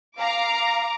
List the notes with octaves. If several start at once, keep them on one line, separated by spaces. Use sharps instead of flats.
F5 A#5 D6